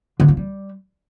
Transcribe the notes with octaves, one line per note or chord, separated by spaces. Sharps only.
D3
F3
G3